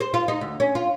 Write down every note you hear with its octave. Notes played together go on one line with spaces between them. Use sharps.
C5
F4
D#4
D2
C#4
F4